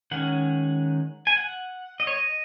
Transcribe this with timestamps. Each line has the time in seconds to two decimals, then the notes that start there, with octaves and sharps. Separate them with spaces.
0.11 D#3 G#3 C#4 F#5
1.27 G#5
1.37 F#5
2.00 D#5
2.07 C#5
2.16 D#5